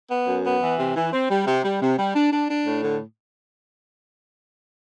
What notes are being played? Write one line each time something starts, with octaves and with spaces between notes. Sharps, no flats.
B3
F#2
B3
E3
C3
E3
C4
G3
C3
G3
C3
G3
D4
D4
D4
A2
D3